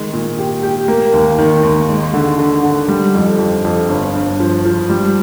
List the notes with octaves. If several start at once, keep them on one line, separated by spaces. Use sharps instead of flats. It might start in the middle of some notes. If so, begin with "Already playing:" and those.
Already playing: D#3 G#3
A#2
G4
G4
A#3
D#2
D#3
D#2
G#3
D3
D3
D3
G3
F2
F2
F2
G1
G2
F3
F3
G3